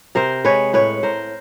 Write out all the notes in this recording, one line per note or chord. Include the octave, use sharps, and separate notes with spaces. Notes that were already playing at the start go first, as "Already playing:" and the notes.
C3 A#4 C5
G#3 B4 C#5
A2 B4 C#5
A2 A#4 C5